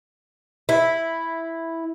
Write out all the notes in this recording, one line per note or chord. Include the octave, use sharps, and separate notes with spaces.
E4